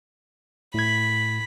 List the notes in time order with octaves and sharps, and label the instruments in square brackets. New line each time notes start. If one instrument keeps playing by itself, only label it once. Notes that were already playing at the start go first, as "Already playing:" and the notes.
[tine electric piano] A2 G#6 [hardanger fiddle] B5